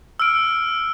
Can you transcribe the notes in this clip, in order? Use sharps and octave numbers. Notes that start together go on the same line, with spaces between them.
E6 F6 D7